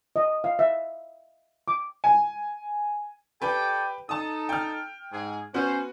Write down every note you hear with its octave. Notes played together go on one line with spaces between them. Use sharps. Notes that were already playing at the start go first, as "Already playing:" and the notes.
D#5
F5
E5
D6
G#5
G4 A4 B4 D5 G5
D#4 A4 A5 D#6
G5 F6
G#2 G#4
B3 C#4 F#4 C5 F#6